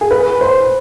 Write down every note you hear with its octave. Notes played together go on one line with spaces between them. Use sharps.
G#4
B4
C5